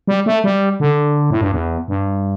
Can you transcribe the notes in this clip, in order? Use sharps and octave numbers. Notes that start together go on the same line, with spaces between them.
G3
A3
G3
D3
A2
G2
E2
G2